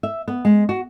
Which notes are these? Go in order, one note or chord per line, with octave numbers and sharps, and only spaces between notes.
E5
B3
G#3
F#4